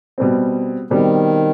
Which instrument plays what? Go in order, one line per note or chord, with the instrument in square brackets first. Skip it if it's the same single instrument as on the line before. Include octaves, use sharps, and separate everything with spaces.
[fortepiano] B2 G3 C4
[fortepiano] B2 G3 C4 [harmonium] D#3